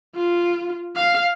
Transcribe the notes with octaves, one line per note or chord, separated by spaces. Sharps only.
F4
F5